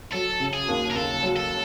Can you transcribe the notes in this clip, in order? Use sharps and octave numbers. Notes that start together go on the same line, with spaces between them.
F#3 A4
C#3
G#4
D#2
A#4
D#2 A4
F#3
A4